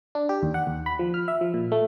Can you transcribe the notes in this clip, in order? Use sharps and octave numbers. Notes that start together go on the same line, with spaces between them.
D4
G4
D#2
F#5
D#2
B5
F3
F6
E5
F3
A#2
A3